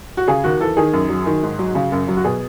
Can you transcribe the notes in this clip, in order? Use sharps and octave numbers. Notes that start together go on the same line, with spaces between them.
F#4
C#3 G#4
D#2 F#4
E3 A4
D#3 G#4
F#2
F#3
D#3
G#2
F#3
C#3
F#2
F#3
F#4
B2 G#4